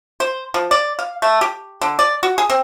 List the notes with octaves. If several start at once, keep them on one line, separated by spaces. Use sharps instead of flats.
C5
F3
D5
F5
A3
G4
D3
D5
F#4
G#4
C4